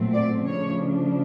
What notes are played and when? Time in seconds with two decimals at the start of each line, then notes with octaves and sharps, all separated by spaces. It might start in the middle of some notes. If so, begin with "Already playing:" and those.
Already playing: A#2 F#3 A3 C4
0.14 D5
0.47 C#3 F3 A3 D4 C#5